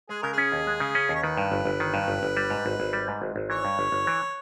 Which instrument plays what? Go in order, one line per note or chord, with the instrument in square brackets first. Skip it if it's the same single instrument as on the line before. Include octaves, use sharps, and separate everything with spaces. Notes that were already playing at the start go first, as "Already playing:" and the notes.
[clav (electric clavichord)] G#3 [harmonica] G#4
[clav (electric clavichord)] C#3 [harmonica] A#4
[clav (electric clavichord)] C#4 [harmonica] G#4
[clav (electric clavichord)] D#2
G#3
C#3
C#4
D#2
[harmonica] C#5
[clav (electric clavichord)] D#3 [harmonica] B4
[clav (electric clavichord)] G2
G1
G1
D#3
G2
G1
G1
G3
G#2
G#1
G#1
G3
G#2
G#1
G#1
[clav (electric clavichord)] E3 [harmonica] C#5
[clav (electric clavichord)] G2
G1
G1
E3